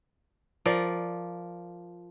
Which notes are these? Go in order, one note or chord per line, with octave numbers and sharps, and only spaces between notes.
F3 A#4 D5